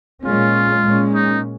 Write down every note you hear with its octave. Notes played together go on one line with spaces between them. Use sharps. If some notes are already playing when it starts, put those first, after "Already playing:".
A#2 G#3 C#4 F4
A#2 G#3 C#4
D#4